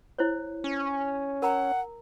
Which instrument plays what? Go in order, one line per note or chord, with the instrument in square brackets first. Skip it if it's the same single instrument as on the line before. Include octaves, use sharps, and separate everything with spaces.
[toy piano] E4 C5 C#5
[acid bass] C#4
[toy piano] A#4 A#5 [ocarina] F#5